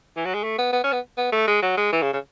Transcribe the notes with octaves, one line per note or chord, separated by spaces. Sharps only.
E3
F#3
G#3
A3
B3
B3
C#4
B3
B3
A3
G#3
F#3
G#3
E3
C#3
C#3